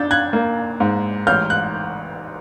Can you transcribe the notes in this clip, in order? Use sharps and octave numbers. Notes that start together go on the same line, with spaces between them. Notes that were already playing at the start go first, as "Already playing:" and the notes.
Already playing: D4 G6 A6
F#6 G#6
A#3
G#2
A1 F6 G6
F#6